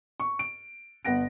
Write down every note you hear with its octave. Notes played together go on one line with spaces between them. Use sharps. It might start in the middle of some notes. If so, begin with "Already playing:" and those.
C#6
D7
G1 B3 F#5 A#6 D7